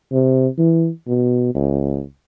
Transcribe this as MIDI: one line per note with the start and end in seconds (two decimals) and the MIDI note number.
0.12 0.47 48
0.58 0.88 52
1.08 1.54 47
1.55 2.02 37